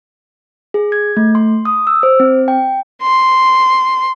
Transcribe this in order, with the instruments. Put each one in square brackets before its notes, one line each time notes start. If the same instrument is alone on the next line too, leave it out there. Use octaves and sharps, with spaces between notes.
[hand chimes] G#4
G#6
A3
C6
D#6
E6
C5
C4
G5
[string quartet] C6